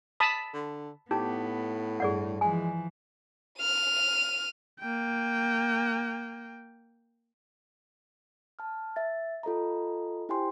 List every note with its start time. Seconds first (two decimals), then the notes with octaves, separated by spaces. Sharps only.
0.20 A5 B5 D#6
0.54 D3
1.11 A2 B3 D#4 G4
2.00 G2 G#4 D5 F#5
2.41 E3 F3 G#3 G#5
3.61 F6 D#7
4.80 A#3 G5
8.59 A5 F6
8.96 E5 A6
9.43 F4 A4 D#5 A#5
10.29 E4 G4 C5 G5 G#5 C6